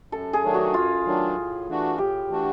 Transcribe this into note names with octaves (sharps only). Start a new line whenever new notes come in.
F#2 A4
G#4
D#3 F#3 A3 D4
F#4
F#2 F4
D#3 F#3 A3 D4
A2
E3 A3 D4 F#4
A2 G4
E3 A3 D4 F#4